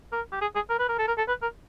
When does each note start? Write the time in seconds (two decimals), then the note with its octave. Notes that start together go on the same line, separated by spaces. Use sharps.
0.12 A#4
0.32 G4
0.41 G#4
0.55 G#4
0.70 A#4
0.79 B4
0.89 A#4
0.99 A4
1.08 A#4
1.18 A4
1.28 B4
1.42 A#4